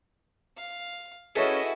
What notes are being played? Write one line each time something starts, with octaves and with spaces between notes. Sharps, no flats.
F5
C#4 E4 F#4 G#4 A4 B4 D#5 E5